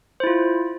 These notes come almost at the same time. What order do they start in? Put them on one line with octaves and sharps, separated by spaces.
C5 E4 F4